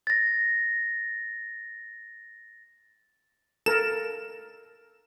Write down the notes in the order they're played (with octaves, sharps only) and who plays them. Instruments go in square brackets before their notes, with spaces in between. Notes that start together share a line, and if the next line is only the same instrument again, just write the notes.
[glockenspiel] A6 A#6
[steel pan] A4 A#4 [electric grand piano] E7